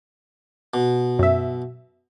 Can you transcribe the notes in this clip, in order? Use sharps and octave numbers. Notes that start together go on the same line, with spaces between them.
B2
F#2 E5